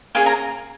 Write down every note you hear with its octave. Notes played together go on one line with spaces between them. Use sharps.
A#3 C#4 G#4 G#5
A#5